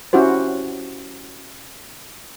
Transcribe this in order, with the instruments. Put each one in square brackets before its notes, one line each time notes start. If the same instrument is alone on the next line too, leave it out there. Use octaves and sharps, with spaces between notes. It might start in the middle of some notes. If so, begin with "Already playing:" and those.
[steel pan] C#4 E4 F#4 G4 C5